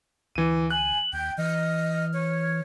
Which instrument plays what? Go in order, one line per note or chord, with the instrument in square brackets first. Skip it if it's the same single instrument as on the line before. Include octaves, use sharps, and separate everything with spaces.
[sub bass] D2 [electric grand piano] E3 D#7
[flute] G#5 [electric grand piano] F#6 [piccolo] F#7
[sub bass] D#2 [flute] G5 [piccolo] G6
[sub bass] E3 [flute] D#5 [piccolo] F6
[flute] C#5